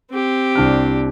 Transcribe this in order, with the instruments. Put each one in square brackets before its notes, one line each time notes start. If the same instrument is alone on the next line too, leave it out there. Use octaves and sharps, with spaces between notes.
[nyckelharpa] C4 G4
[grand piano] C2 D4 F6